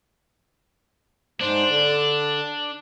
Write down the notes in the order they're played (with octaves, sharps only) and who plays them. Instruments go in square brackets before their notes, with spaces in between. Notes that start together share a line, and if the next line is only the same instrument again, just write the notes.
[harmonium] G#2 C5 [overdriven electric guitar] D4
[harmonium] D3